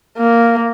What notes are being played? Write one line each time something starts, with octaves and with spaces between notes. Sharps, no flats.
A#3